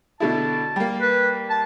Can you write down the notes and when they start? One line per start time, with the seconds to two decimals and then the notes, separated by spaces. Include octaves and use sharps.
0.20 B2 D3 E4 A5
0.76 G3 A#3
1.01 B4
1.50 A5